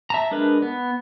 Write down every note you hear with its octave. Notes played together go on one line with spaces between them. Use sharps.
E5 A5 A#5
G#3 D4 A#4 B4
B3